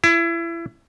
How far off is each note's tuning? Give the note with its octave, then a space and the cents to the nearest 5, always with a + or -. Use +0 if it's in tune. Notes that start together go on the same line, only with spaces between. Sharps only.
E4 +30